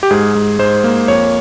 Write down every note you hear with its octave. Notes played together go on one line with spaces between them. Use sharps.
G4
G#2 G#4
G#2
G#2 C5
A#3
F2 C#5